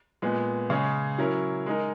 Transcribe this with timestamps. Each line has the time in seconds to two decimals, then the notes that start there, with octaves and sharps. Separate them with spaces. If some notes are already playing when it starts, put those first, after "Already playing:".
0.22 A#2 G#3 B3
0.70 C#3 G#3 C#4 G#4 C#5
1.18 F#3 C#4 E4 A#4
1.66 G#3 D#4 A#4